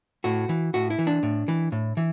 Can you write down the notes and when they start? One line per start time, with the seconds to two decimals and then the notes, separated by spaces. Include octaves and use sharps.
0.24 A2 F#4
0.49 E3
0.74 A2 F#4
0.90 E4
0.99 E3
1.07 D4
1.23 A2
1.48 E3
1.72 A2
1.97 E3